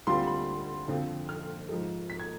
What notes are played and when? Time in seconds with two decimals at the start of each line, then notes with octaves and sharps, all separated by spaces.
0.07 D2 D3 G3 C4 F4 C6
0.27 B5
0.88 F2 D3 F3 C4 F4
1.29 F6
1.69 G#2 F3 G#3
2.10 B6
2.20 G#6